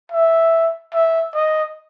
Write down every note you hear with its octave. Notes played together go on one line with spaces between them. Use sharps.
E5
E5
D#5